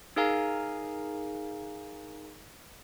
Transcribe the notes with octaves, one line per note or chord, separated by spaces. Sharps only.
D#4 G#4 A#4 F5 G#5 A#5